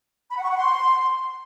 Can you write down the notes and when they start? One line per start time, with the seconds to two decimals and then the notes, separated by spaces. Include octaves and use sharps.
0.31 B5
0.37 F#5
0.44 C#6
0.50 F#5
0.56 C6